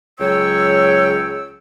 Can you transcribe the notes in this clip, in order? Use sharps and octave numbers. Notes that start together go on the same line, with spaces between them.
C#2 F#3 C#5 G5 E6